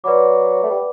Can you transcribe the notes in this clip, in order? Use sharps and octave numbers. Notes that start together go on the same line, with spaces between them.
F#3 B4 D5 F#5 B5 D6
A3
G3